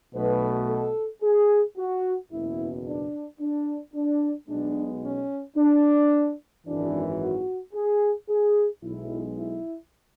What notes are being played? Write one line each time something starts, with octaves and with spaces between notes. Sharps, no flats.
B1 B2 A3 B4
A4
G#4
F#4
F#1 E2 B2 E4
D4
D4
D4
B1 B2 G#3 B3 D4
C#4
D4
G#1 F#2 E3 D4
F#4
G#4
G#4
B1 B2 G#3 E4
E4